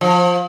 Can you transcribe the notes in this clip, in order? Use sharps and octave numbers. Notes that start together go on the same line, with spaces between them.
F3